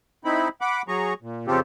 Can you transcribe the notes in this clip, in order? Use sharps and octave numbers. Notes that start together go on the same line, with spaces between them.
C4 D#4 E4 B5
F#5 B5 D6
F#3 G#4 A#5 C#6
A#2
F2 C#3 C4 F4 G4 A4